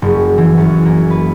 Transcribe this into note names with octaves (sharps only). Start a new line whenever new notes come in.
F#1
E3
F#2
A#3
B4